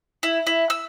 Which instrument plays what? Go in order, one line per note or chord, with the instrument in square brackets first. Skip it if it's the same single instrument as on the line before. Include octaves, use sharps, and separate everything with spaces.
[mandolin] E4
E4
E6